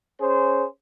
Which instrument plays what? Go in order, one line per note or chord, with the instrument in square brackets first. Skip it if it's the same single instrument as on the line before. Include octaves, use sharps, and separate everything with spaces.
[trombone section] C#4 G#4 C5